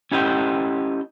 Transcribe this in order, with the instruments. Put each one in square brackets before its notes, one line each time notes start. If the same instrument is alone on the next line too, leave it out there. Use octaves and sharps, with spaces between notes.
[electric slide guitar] C#4 E4 G4 D#5